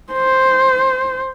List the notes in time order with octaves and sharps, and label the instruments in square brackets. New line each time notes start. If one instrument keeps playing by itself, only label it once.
[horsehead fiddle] C5